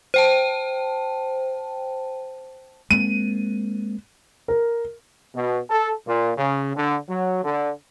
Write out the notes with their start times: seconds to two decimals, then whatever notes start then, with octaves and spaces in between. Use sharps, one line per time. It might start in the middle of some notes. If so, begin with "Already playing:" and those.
0.14 C5 G5 A5
2.91 G#3 A#3 C4 D#7
4.48 A#4
5.35 B2
5.70 A4
6.07 A#2
6.37 C#3
6.76 D3
7.09 F#3
7.44 D3